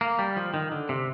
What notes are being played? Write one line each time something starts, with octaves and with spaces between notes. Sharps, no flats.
A#3
G3
F3
D#3
D3
C3